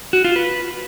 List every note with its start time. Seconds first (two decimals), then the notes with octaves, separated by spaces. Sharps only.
0.13 F#4
0.24 F4
0.36 B4